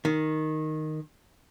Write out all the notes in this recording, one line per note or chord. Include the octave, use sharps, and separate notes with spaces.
D#3